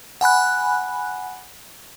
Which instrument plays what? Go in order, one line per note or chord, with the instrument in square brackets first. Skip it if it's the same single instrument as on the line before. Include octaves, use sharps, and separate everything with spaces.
[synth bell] F#5 G#5 B5 F#6